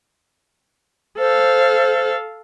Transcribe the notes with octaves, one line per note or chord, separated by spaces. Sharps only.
A4 C5 F5